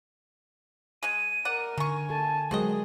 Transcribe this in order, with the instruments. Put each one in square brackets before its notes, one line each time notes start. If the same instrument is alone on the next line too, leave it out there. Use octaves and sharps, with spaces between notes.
[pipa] G#3 G#5 [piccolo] D#7
[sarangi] A#4 [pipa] D5 F#5
[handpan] D3 [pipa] D#3 C#6 [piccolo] G#5
[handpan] A4 [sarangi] A5
[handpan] F#3 G#3 A#4 [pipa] C4 F#4 D#5 [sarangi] G#4